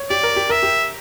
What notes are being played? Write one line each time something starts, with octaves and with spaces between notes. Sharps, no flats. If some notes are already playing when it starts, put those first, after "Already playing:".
Already playing: C#5
G4 D5
A#4
G4
A#4 E5
G4